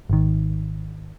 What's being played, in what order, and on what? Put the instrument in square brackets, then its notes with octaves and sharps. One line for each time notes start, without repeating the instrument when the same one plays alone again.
[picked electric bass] G#1 D#3